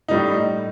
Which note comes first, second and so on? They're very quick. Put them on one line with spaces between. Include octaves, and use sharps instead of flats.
D#4 G3 A2